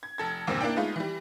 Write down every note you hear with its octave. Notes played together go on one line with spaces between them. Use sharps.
G#6
F1 A4 G#6
E2 G2 A#2 D3 C4
A#3 D4 E4 D5 G5
G#3 A3 B3 D#4 F4
E3 G3